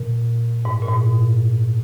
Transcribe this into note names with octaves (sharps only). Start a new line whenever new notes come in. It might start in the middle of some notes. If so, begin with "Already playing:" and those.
Already playing: A#2
G#2
A#2
G#2